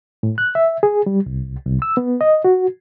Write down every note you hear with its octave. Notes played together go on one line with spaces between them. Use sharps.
A2
F#6
E5
G#4
G3
C2
C2
E6
B3
D#5
F#4